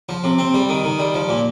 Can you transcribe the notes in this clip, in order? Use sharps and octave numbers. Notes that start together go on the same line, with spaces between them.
F3
C3
C4
G3
D#3
D#3
G3
F3
A#2